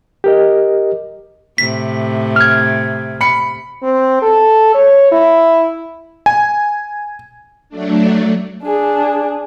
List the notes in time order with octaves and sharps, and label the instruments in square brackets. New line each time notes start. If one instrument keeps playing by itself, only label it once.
[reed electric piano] G4 A#4 D#5
[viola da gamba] A2 C3 [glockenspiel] B6
[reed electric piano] F6 G#6
[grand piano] B5 C#7
[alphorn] C4
A4
C#5
E4
[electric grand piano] G#5
[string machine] F#3 A3 D4
[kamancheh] D4 G#4